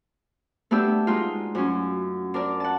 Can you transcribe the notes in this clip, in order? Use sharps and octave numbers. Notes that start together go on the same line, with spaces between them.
A3 B3 D4 G4 E6
G#3 D#4 F4
F#2 C#4
D4 A#4 D5
F#5 A5